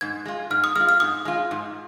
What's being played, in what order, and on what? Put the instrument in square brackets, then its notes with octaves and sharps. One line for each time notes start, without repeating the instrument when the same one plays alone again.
[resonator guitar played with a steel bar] G#2 [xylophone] G#6
[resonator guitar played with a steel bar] G#3 F4
[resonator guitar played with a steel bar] G#2 [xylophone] F6
[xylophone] D#6
[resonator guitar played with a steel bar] G#3 [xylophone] F6
[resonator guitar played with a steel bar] F4
[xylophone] F6
[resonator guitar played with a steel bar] G#2 [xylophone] D#6
[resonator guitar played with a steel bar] G#3 F4
G#2